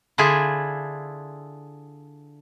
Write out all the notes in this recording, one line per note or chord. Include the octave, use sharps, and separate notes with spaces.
D3 D4 E4 F4 G#4 E5